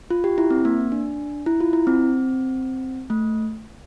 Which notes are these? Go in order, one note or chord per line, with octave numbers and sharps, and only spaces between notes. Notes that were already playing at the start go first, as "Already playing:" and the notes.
F4
G4
E4
C4
A#3
D4
E4
F4
E4
C4
A3